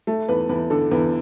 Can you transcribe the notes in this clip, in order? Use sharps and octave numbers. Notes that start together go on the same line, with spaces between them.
A3
E2 B4
E2 B4
D3 A4
E2 B4